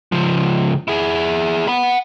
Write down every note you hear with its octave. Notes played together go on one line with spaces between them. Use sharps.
C#2 F3
E4 G#4
F#5 B5